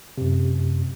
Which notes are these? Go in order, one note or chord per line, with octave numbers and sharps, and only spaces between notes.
F#2 C3